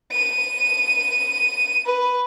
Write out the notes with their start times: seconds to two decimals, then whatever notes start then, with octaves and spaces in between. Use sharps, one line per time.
0.12 D#7
1.86 B4